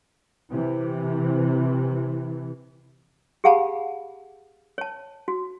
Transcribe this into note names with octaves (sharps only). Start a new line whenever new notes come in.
C3 E3
G4 G#4 F5 F#5 A5 B5
C#5 A5
F#4